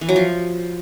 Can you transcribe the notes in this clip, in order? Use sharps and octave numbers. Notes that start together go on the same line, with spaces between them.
E3
F#3
F3